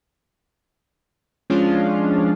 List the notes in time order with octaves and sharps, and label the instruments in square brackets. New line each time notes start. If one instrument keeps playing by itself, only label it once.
[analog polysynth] F3 G#3 C#4 D4 F4